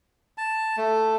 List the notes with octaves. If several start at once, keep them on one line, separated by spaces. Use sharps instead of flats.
A5
A3